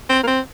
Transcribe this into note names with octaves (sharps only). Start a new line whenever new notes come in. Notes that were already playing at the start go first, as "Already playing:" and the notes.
C4
A#3
C4